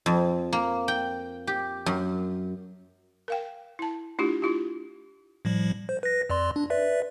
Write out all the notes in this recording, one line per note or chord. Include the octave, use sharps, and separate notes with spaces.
F2
A#3
G5
G4
F#2
A#4 F5 G5
E4 A5
A3 D4 E4 F4 G4
E4 F4 G4
A2 F3 G3
C5
B4 A#6
F2 D5 C6
D4
B4 D5 E5